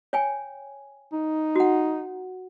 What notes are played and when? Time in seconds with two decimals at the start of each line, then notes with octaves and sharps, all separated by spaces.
0.13 C#5 G5 G#5
1.13 D#4
1.56 F#4 F#5